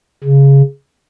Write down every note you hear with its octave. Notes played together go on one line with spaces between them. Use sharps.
C#3